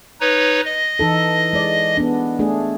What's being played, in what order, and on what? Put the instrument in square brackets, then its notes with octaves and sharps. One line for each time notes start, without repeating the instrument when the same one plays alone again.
[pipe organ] D#4 B4 C#5
D#5
[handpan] E3 D#4 A4
G#3 D5
B3 D4
A3 D4 G#4